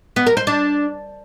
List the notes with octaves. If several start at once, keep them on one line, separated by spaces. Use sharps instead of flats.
B3
A#4
C5
D4